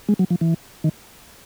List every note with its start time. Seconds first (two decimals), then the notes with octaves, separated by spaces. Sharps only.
0.09 G#3
0.19 F#3
0.30 F3
0.41 E3
0.84 D#3